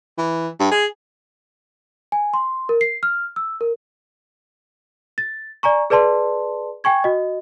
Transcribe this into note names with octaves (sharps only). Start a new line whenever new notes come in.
E3
G2
G#4
G#5
C6
A#4
C7
F6
E6
A#4
A6
D5 G#5 A#5 C#6
G#4 B4 D5 A5 C6
G5 G#5 C#6 G#6
F#4 D#5